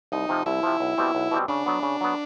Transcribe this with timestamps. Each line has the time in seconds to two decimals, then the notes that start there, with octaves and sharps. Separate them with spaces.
0.12 C2 D#4
0.29 C3 F3
0.46 C2 E4
0.63 C3 F3
0.80 B1
0.98 B2 G3 C4
1.15 B1
1.31 B2 G3 C4
1.48 C#3 D4
1.66 F#3 B3
1.83 C#3
2.01 F#3 B3